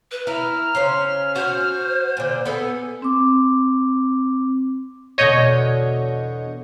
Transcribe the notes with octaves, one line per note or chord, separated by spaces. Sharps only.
B4
E4 A#5 F6
C#3 C#4 C5
F#4 C5
A#2 D3
B3 G#4 A4
C4 D6
E2 B2 D3 C#5 D#5 G6